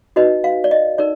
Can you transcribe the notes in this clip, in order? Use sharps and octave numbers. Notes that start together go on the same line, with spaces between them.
D#4 F#4 B4 D#5
F5
D5
D#5
D#4 A#4 D5